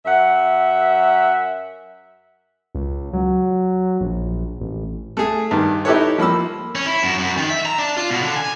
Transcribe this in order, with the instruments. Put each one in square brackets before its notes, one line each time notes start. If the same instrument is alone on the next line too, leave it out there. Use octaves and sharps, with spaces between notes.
[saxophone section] F#2 E5 F#5
[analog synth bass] C#2
F#3
A#1
A1
[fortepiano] A3 G#4
G2 D#3
D#4 E4 G4 A4 B4 C#5
F3 A#3 B5 E6
[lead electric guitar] C#4
E4
F#2
F#2
D#3
E5
A#5
D4
F4
B2
D3
G#5